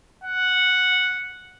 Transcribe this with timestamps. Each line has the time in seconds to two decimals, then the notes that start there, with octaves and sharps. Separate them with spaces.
0.24 F#5